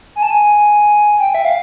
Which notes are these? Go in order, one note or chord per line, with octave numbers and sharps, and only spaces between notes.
G#5
A5
G#5
G5
E5
F5